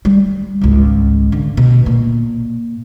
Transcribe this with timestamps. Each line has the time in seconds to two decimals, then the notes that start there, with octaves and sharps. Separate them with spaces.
0.05 G3
0.61 G#1 C#2
1.32 D3
1.57 B2
1.86 A#2